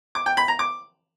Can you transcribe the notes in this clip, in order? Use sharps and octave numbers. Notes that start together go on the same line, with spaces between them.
D6
G5
B5
A#5
D6